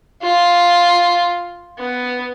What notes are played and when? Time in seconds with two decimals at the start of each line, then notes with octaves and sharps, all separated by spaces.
0.22 F4
1.79 B3